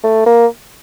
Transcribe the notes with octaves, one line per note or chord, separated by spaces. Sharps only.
A3
A#3